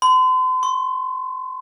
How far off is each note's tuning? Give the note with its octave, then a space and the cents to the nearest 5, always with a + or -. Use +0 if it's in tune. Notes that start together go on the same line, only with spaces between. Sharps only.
C6 -40
C6 +35